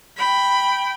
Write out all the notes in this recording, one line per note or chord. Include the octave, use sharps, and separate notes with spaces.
G5 B5